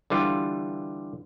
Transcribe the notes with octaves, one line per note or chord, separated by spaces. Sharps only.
D3 E3 G3 F4